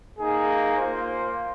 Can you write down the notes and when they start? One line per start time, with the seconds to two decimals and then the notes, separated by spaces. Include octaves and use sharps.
0.19 A#3 D#4 G#4
0.77 A#3 F4 C5